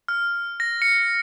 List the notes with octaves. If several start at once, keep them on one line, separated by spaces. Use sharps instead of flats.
F6
A#6
C#7